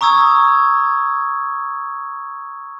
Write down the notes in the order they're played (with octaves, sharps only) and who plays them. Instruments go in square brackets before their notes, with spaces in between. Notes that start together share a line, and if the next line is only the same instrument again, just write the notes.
[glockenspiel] A#5 C#6 D#6 E6 G#6